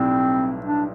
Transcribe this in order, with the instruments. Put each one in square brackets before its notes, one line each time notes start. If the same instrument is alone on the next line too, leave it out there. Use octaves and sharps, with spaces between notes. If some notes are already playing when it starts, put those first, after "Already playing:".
Already playing: [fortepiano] B1 A2 G3 D4 [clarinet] C4
[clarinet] D4